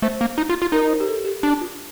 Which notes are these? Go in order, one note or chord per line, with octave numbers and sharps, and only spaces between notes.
A3 C5
A#3
D#4
F4
F4
D#4 A#4
C5
G4
A4
G4
D4
F4